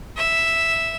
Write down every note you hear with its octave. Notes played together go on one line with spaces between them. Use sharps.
E5